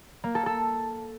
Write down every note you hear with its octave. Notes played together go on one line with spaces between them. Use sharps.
A#3
A4
A4